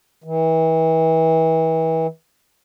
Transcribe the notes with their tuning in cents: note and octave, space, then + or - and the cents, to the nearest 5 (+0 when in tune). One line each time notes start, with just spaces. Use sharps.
E3 -35